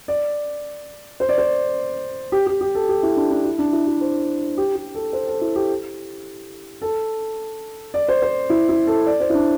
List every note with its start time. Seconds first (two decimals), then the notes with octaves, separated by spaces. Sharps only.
0.08 D5
1.20 C5
1.29 D5
1.38 C5
2.32 G4
2.47 G4
2.61 G4
2.75 A4
2.89 G4
3.03 E4
3.17 D4
3.31 D4
3.45 E4
3.59 D4
3.73 E4
3.87 E4
4.01 C5
4.57 G4
4.75 G4
4.95 A4
5.13 C5
5.27 A4
5.41 E4
5.56 G4
6.82 A4
7.94 D5
8.08 C5
8.22 C5
8.50 E4
8.69 E4
8.87 A4
9.06 D5
9.20 C5
9.30 E4
9.34 D4